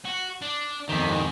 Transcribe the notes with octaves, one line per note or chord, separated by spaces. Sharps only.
F#4
D4
F2 D#3 G4 E5
G#2